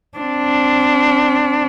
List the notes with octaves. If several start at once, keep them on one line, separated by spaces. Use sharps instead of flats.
C4 D4